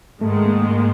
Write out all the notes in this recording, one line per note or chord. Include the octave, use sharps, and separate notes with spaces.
G#2 D#3 G#3 A3
A3
A#3
A#3